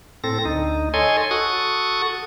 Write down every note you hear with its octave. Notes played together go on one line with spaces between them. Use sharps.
A2 C4 A4 A#6
D2 D#4
A4 C#5 D#5 G#5 C6
F#4 A4 C#6 D#6